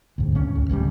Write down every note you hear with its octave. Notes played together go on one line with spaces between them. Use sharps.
D2 G#2
C#2 C#4
C#2
D1 A1 C#3 G3